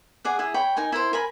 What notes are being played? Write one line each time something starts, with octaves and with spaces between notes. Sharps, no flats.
G#4 D5 F#5
E4 G#4
C#5 G5 B5
D#4 A#4 G#5
E4 A#4 C5
A#4 G#5 B5